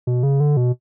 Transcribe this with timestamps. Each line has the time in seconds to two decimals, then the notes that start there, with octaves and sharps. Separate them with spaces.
0.07 B2
0.23 C#3
0.40 D3
0.57 B2